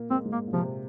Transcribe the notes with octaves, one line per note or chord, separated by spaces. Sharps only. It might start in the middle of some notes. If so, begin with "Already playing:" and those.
Already playing: A#2 A#3
G#3 C4
A#3
G#2 G#3
A#3
A#2
C3 F3